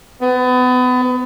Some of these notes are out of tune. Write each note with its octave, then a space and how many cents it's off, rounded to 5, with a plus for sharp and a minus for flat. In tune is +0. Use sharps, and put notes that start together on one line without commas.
B3 +30